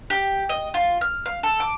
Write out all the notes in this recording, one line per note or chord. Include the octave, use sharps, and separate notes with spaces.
G4
D#5
F4
F6
F5
A4
D6